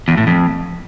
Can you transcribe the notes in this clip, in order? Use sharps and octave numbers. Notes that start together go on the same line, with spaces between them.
E2
A2
F2